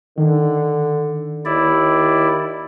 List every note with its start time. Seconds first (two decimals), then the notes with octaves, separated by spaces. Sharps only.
0.18 D3 D#3
1.45 D#2 E4 D5